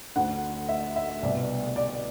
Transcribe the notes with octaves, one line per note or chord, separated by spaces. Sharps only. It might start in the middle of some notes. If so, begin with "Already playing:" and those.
D2 D3 F#5
E5
E5
C2 B2 D5
D5